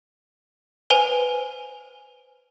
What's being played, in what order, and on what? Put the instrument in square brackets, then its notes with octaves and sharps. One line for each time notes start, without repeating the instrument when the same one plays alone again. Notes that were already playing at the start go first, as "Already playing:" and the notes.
[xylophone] B4 C5 G#5 D#7 F7